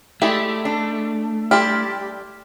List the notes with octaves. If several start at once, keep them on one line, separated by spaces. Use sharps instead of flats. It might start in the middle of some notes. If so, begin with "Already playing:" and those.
G#3 A3 E4 G4 D5 E5
D4
G3 D4 E4 G4 C6 F6